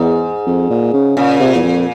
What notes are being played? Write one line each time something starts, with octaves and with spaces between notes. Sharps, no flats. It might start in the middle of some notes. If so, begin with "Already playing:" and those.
Already playing: E2 G#2
F2
A#2
C#3
A#2 C#3
C3
E2
F2